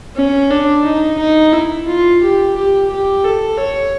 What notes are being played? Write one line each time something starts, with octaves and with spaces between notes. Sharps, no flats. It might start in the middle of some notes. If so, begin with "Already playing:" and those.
C#4
D4
D#4
D#4
E4
F4
G4
G4
G4
A4
C#5